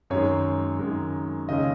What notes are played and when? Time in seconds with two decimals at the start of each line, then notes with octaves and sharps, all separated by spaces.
0.10 F#2 D#3 G#3 C#5
0.79 F#2 D#3 G#3
1.49 D#2 C#3 G#3 C#4 D#5